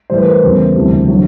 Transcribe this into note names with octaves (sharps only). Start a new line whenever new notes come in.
A2 E3 G3 C5
B4
A#4 C5
E2 C#3 E3 G3
D2 C3 E3 G3
D3 F#3